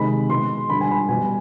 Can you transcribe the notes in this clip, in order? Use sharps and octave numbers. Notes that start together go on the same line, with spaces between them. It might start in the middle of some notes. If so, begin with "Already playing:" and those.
Already playing: C3 D#3 G#3 B5
B2 G#3 C6
D3 G3 B5
G#5
B5
B2 G3 G#5